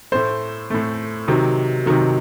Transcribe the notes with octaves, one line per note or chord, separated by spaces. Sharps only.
A2 A3 C5
A2 A3
C3 D#3 F#3
C3 D#3 F#3